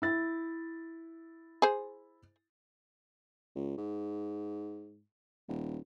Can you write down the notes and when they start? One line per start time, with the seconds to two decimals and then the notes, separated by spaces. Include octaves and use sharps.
0.02 E4 A6
1.62 G#4 C5
3.55 C#2
3.78 G#2
5.48 D#1